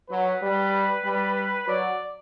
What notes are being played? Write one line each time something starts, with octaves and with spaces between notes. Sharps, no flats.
F#3 B4
G3
G3
F#3 D5